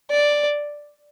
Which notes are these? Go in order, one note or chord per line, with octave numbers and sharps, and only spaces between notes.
D5